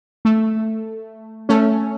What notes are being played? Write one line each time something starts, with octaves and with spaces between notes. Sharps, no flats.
A3
A3 C#4